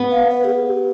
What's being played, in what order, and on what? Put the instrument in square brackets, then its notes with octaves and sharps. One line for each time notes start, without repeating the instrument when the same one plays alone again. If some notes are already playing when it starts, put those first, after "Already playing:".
Already playing: [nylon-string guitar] B3
[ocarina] F5
B4
G4
G#4
G4